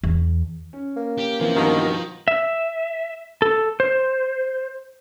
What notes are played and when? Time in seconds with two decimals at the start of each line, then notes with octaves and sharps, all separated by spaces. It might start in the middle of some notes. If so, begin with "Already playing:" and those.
0.03 E2
0.73 C#4
0.96 A#3
1.18 G4
1.41 E3 F3 A#3 C4 C#4
1.55 G2 B2 D#3
1.81 A#6
2.28 E5
3.42 A4
3.80 C5